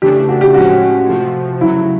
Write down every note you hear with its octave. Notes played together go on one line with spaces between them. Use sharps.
C#3 E3 A3 D4 G4
F#4
G4
A2 F3 G#3 C#4 F#4
C3 F3 A3
C#3 F#3 A3 E4